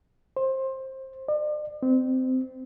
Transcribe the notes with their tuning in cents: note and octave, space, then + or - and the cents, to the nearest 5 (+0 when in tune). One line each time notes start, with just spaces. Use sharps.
C5 +20
D5 +40
C4 -20